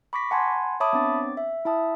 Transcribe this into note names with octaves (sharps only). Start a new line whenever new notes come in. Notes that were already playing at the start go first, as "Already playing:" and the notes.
B5 C#6 D6 A#6 B6
F#5 G#5 A5 B5 C6 G#6
C#5 E5 A5 B5 D6 D#6
B3 C4 D4 C#5 D6 A6
E5
E4 E5 A5 D#6